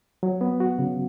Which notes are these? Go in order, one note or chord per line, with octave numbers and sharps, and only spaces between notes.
F#3
B3
F#4
C#3